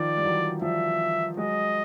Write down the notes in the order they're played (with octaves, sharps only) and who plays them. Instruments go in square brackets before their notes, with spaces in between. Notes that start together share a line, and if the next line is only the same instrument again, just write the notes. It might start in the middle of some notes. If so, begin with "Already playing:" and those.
Already playing: [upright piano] D#3 F3 [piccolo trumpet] D5
[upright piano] G3
E3 F#3
[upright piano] F3 G3 [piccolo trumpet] E5
[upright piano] F#3 G#3 [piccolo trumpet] D#5